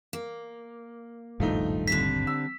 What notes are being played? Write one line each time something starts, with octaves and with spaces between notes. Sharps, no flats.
A#3
D#1 G#1 G2 F3 A3 D#4
D3 G3 C4 B6
E6